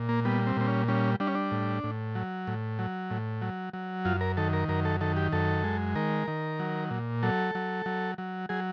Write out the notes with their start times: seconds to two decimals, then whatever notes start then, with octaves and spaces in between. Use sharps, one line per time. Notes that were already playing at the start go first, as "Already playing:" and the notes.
Already playing: A#2
0.09 A#3
0.25 G3 B3
0.47 C4
0.57 A#2 C4
0.67 C#4
0.88 G3 C#4
1.20 G3 D4
1.27 C#4
1.35 D4
1.51 A2
1.84 A2
2.15 F#3
2.47 A2
2.79 F#3
3.10 A2
3.42 F#3
3.73 F#3
4.05 F#2 F4
4.21 A#4
4.37 D#3 A4
4.53 A#4
4.68 F#2 A#4
4.85 A4
5.01 D#3 A4
5.16 G4
5.32 F#2 A4
5.64 G#3
5.95 D#3 A#4
6.28 D#3
6.60 F#3
6.91 A#2
7.23 F#3 A4
7.55 F#3
7.86 F#3
8.18 F#3
8.49 F#3 G#4